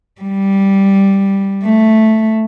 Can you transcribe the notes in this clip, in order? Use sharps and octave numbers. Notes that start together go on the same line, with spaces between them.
G3
A3